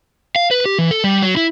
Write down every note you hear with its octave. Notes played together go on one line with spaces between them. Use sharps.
F5
B4
G4
E3
A4
G3
F#3
E4